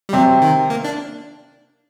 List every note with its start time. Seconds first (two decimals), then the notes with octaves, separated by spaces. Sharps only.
0.09 G3
0.13 C3 F#3 C4
0.42 D#3
0.70 A#3
0.84 D4